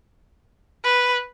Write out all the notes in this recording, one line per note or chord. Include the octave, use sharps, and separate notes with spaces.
B4